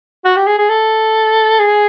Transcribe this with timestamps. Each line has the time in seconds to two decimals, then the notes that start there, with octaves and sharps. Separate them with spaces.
0.25 F#4
0.36 G4
0.47 G#4
0.58 G#4
0.69 A4
1.59 G#4